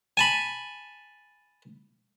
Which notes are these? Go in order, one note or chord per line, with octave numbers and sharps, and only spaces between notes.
G#5 A5 B5